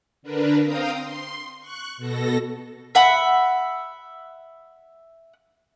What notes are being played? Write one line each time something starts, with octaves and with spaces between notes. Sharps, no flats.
D3 D4 A#4 B4
C4 F5 G5 A#5 D#6
C6
C#6 F#6
B2 A4 A#6
E5 F#5 B5